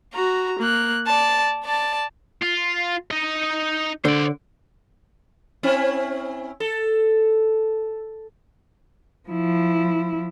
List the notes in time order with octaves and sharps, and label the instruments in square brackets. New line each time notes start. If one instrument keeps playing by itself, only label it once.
[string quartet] F#4 A#5
A#3 F#6
D5 A5
D5 A5
[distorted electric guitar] F4
D#4 D#5
[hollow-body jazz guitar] D3 [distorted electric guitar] C5 D5
[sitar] C4 C#4 E4
A4
[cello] F3 E4